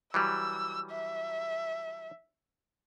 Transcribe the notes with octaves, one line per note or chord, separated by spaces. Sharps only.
E3 F#3 G3 E6
E5